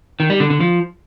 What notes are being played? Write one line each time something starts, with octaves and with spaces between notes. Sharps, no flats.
D#3
G3
D3
D3
F3